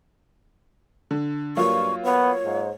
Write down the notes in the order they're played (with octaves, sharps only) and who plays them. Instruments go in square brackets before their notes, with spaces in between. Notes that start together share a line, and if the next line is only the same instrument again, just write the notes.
[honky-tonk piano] D3
[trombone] G2 [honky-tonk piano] F#3 A#3 F4 [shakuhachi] C#6
[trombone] B3 [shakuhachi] C#5
[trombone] G#2